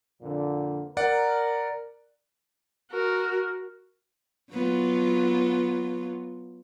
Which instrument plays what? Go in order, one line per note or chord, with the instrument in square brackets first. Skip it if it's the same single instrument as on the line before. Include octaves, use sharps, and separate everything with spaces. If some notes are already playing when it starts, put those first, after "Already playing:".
[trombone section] F2 A#2 D3
[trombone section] A#4 [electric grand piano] D5 F#5
[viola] F#4 A#4
[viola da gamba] F#3 B3 F4